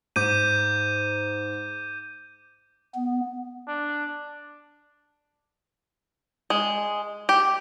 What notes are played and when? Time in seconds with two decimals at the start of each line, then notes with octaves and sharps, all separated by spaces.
0.16 G#2 D6 G6 D#7
2.95 B3
3.68 D4
6.50 G#3
7.29 G4